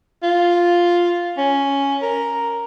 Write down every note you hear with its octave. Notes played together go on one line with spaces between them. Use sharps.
F4
C#4
A#4